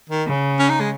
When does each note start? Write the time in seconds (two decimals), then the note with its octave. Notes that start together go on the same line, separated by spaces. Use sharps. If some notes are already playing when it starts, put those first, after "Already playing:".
0.09 D#3
0.26 C#3
0.59 C#4
0.69 D#4
0.80 G#3